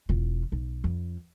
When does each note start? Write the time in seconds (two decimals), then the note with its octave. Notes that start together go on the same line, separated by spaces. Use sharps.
0.09 E1 F4
0.52 B1
0.84 F2